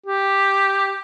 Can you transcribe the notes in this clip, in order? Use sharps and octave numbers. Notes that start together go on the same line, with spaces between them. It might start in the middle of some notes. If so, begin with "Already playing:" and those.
G4